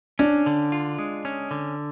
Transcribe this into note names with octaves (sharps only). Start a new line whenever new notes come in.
C#4 D4
D3
F4
G#3
C#4
D3